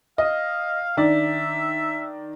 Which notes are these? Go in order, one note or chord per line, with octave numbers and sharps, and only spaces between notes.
D#5 F5
D#3 D4 D5 E5